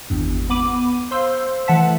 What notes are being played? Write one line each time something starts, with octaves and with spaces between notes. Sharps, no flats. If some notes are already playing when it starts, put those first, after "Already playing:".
G#1 E2 G2
B3 B5 D6 D#7
C5 F5 C6 E6
E3 A3 F#5 A5 B6